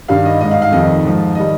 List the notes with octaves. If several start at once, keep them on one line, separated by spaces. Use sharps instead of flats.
G2 D#3 G3 F5
D#5
G#2 G3 D#5
F5
F5
F2 D#3 G3 D#5
G#2 F3
D#3 G3 D#5